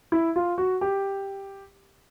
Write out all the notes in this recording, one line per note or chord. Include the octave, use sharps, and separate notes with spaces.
E4
F4
F#4
G4